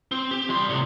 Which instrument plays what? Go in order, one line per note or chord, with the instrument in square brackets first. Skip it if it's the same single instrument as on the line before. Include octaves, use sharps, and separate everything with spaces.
[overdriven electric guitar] C4
G4
G3 C6
A2 C3